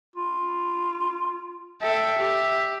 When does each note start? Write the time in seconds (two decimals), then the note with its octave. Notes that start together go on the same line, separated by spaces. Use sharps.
0.16 F4
1.82 A4 E5 G5
2.19 G4